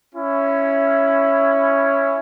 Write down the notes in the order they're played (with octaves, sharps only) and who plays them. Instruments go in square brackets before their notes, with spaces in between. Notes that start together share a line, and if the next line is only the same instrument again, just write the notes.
[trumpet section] C#4 E4